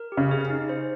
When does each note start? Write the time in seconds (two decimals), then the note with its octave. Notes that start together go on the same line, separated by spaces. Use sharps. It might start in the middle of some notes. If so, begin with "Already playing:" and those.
Already playing: A#4
0.12 G4
0.17 C#3
0.31 G#4
0.50 D#4
0.69 C5